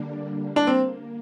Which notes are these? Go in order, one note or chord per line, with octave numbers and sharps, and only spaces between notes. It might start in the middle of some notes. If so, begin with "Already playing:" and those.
Already playing: D3 G3 A#3 D4
A#3 D4
C4